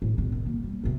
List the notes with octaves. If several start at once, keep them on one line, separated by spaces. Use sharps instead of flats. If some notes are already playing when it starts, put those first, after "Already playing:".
A2
E1 D#4
D#3
A#3
G3
B1 C3